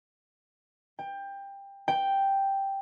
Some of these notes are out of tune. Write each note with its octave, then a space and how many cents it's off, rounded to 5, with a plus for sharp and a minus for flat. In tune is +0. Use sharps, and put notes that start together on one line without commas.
G5 +20
G5 +0